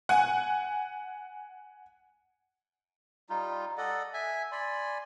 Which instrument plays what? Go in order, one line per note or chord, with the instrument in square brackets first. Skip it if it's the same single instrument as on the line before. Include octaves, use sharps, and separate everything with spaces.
[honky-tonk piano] F#5 G#5
[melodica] G3 D#4 F4
A4 D5 D#5 F#5
E5 G#5
D5 G#5 B5 C6